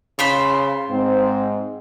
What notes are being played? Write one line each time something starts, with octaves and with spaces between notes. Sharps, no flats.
C#3 F4 C5 B5
G#2 C4